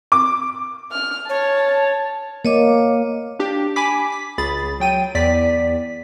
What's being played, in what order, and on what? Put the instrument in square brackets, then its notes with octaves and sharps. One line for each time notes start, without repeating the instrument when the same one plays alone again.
[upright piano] D6
[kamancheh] F6
[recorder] C#5 [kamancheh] A5
[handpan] A#3 [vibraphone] C#5 D#5 D6
[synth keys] D4 G4
G#5 B5 D6 B6
B6
C#2 G#4 B5 A6
F#3 G5 D#7
E2 D5 B6